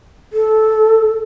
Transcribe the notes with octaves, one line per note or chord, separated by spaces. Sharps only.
A4